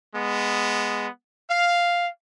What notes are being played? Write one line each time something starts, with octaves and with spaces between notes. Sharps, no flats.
G#3 B3
F5